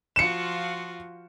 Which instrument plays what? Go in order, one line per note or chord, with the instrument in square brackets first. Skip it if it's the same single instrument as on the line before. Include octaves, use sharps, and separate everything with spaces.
[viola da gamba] F3 F4 F#4 [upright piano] C#7 E7